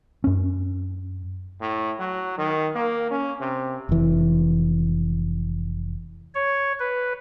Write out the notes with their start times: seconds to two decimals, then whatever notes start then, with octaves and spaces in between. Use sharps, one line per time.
0.24 F#2 C#4
1.61 A2
2.00 F#3
2.38 D#3
2.75 A#3
3.11 C#4
3.41 C3
3.89 F1 E3
6.35 C#5
6.80 B4